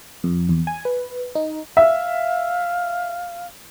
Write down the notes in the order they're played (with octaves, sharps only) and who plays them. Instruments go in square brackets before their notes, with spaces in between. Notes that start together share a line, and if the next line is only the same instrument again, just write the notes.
[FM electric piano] F2
E2
G#5
B4
D#4
[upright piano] E5 [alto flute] F5